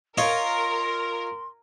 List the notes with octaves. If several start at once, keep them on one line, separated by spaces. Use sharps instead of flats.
F4 A#4 C#5 D#5 C6